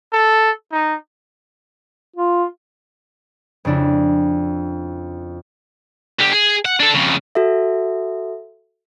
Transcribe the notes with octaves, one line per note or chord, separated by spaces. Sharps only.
A4
D#4
F4
F2 C#3 D4 E4
D3 G4
G#4
F#5
D4 A4
F2 C#3
F#4 A4 E5